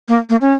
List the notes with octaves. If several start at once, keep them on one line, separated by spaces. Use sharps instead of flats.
A#3
A#3
C#4